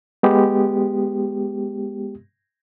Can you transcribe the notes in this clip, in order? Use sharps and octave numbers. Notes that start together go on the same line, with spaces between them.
G#3 B3 G4